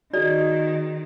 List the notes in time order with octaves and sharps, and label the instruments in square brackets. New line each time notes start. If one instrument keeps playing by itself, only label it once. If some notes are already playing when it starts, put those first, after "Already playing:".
[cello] D#3 [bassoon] D#4 [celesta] F#4 G#4 G#6 [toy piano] D5